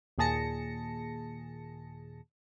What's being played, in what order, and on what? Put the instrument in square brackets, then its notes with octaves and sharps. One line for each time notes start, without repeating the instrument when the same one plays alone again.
[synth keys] D#2 A#2 G#4 A5 A#6 C#7